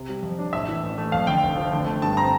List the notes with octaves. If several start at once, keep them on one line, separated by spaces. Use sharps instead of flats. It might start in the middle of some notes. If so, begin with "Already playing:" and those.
Already playing: C3
G3
F2
D4
A2 E5
E3
A1
A3
F2 F5
D3 G5
F1
F3
D3
A3
G2 A5
C4 A#5